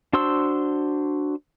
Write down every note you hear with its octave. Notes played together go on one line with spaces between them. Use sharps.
D4 F#4 C5 C6 E6